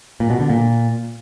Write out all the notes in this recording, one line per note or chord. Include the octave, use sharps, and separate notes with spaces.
A#2
B2
D3
A#2